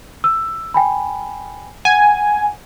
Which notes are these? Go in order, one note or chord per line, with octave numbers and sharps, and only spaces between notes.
E6
G5 G#5 B5
F#5 G#5